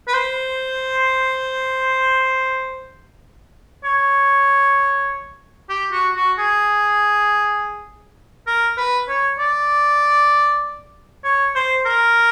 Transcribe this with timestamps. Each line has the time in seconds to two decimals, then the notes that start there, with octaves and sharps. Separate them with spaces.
0.08 B4
0.14 C5
3.84 C#5
5.69 G4
5.92 F#4
6.16 F#4
6.38 G#4
8.47 A#4
8.77 B4
9.08 C#5
9.39 D5
11.24 C#5
11.55 C5
11.86 A#4